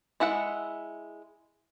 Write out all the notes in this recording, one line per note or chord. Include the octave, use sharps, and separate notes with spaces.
G#3 E4 E5 F#5